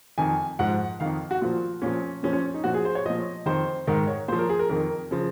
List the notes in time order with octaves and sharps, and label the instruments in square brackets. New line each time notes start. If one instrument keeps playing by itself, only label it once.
[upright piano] F2 D#3 G#5
G#2 F3 F#5
F2 D#3 F5
F#4
A#2 F3 F4
A#2 F3 C#4
A#2 F3 C#4
C#4
D#4
A#2 F3 F#4
G#4
C5
C#5
A#2 F3 D#5
F2 D#3 C5
G#2 D#3 A#4
C#5
A#2 C5
F3
A#4
G#4
A#4
F2 D#3 A#4
C#3 F3